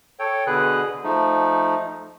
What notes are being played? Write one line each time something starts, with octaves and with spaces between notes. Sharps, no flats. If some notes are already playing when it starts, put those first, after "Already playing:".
A4 C#5 G5
B2 D3 G#4 B4 F#6
F3 A3 D#4